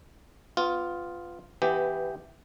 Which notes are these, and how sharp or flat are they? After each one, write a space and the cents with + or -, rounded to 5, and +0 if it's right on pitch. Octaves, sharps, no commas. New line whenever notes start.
B3 +25 F4 +0
E3 +0 B3 +20 G4 +0